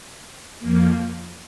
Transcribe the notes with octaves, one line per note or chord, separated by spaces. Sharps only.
F2 F3 A#3